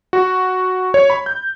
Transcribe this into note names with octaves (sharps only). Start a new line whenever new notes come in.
F#4
C#5
B5
G6